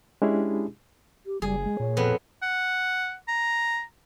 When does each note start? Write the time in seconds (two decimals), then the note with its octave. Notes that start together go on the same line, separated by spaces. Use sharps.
0.22 G#3 C#4 D4 E4 G4 G#4
1.26 G4
1.42 F#1 G3 G#4
1.64 G#3
1.80 A#2 C#5
1.97 F2 B3
2.42 F#5
3.28 A#5